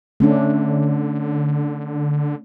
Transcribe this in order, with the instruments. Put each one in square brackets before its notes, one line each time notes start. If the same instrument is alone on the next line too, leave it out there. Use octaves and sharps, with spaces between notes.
[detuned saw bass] D3 [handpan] A3 C#4 D4